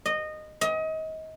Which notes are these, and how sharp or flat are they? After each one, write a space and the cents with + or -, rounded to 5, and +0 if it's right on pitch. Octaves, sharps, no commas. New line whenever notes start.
D#5 -15
D#5 +30